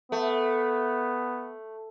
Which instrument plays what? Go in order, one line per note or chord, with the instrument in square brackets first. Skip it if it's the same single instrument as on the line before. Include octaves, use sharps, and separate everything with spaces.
[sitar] A3 [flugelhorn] B3